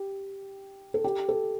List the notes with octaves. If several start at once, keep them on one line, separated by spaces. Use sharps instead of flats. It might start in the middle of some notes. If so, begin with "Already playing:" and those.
Already playing: G4
A4
G4
A4